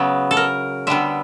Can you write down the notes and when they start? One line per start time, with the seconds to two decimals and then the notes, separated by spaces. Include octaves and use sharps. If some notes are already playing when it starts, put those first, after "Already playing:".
Already playing: C#3 F#3 B3
0.31 A4
0.37 A#4
0.87 D3 G3 B3 E5